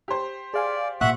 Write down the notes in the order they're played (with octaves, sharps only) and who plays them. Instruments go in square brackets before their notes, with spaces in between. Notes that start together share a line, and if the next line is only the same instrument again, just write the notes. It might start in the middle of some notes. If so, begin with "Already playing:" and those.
[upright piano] G4 C5
[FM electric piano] G#4 F5 G#5 [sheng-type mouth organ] D5
[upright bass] A#2 [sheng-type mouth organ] E5 F#5 F#6 [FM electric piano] C#6